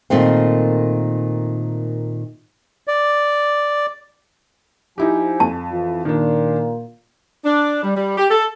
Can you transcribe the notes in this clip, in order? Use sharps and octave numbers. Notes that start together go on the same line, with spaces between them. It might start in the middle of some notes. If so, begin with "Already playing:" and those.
A#2 D#3 A3 C4
D5
F3 D#4 E4 G4 G#5
F2 A5
E3 F4
A#2 D#3 D4
D4
G3
G3
G4
A4